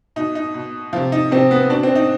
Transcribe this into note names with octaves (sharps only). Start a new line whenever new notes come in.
B2 D#4
D#4
B2
C3 F3 F4
D#4
C3 F3 C4
B3
B2 D4
C4
D#4